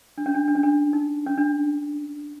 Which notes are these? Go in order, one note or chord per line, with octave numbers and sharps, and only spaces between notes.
D4
C#4
D4
D4
C#4
D4
D#4
C#4
D4